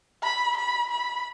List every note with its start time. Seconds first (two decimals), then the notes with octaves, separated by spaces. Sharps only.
0.23 B5
0.57 B5
0.91 B5